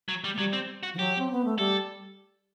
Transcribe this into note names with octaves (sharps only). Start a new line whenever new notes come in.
F#3
G3
A3
F#3 G3
C4
F#4
E3
F#3 G4
C4
B3
A3
G3 A4